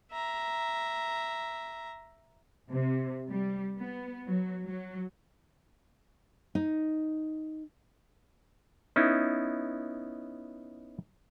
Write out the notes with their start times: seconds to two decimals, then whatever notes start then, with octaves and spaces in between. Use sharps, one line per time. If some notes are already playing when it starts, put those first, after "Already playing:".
0.12 E5 A#5
2.70 C3
3.30 G3
3.76 B3
4.26 F#3
4.65 F#3
6.55 D#4
8.96 B3 C#4 D#4 E4